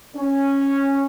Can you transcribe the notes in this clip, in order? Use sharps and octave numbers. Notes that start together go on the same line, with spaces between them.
C#4